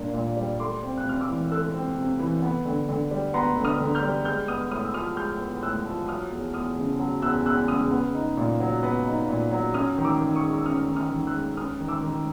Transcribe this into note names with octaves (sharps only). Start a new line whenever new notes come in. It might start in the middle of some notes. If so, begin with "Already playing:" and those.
Already playing: A#2 G3 A#3 D4
A#2
G3
A3 C6 D6
C4
F#6
C3 F6
D6 E6
E3
A3 E6 F#6
C4
C3
E3
B3
D3
D3
G3
B3 A#5 C6
D3
D#6 F6
D3
F6 G6
G3
G#3 F6 G6
B3 D#6 F6
A2 D#6 F6
E6
F3 D#6 F6
G#3 F6 G6
B3
A2 E6 F#6
F3
F#3 D#6 F6
E2
E2 D#6 F6
C#3
F#3
E2 E6 F#6
E2 E6 F#6
C#3 D#6 F6
B3
D#4
A#2
F#3
B3
D#4
A#2
F#3
C#4 D#6 F6
D#3
D6 E6
D#3
C#6 D#6
G#3
E6
C#4 D#6 F6
D#3
D#6 F6
D#3
E6 F#6
G#3
C#4 D#6 F6
D#3
D6 E6
D#3